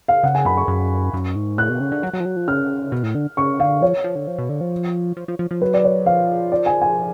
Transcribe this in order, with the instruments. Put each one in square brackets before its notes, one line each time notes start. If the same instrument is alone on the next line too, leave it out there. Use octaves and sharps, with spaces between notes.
[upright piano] F5
[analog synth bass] C#3 [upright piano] F#5
[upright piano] G#5
[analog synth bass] F#2 [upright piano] B5
[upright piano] C#6
[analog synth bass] F#2
F#2
G#2
[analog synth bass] A2 [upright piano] F#6
[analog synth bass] B2
C#3
D3
F#3
F#3
F3
F#3
F3
[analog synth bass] C#3 [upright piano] F6
[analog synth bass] B2
A2
D3
[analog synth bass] C#3 [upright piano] C#6
[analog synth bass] D3 [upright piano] F5
[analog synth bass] F3 [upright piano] C#5
[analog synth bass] F3
D3
F3
B2
D3
F3
F3
F3
F3
F3
[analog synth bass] F#3 [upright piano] B4
[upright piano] D5
C#5
[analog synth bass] F3 [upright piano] F5
[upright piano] D5
G#5
G#5